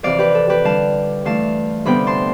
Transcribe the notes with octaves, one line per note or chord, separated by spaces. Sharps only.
F2 C3 E3 D5 F5
G4 B4
A4
G4 B4
D3 G3 D4 F5 A5
G2 E3 A3 E4 F5 A5
D2 C3 G3 B3 G5 B5
A5 C6